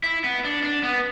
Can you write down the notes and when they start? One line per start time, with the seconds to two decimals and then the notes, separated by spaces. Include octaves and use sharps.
0.04 E4
0.24 B3
0.45 D4
0.64 D4
0.83 B3